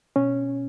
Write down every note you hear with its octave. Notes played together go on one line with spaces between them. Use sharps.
B2 C#4